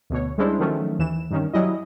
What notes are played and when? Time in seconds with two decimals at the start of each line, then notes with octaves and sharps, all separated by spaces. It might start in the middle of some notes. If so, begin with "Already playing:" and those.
0.10 D2 B2 C#5
0.38 G3 G#3 C#4 D4 E4 C5
0.59 D#3 F3 F#3 A3 C#4
0.99 D#2 E3 E7
1.30 G2 D#3 C#4
1.54 F#3 G3 C#4 E4 D#5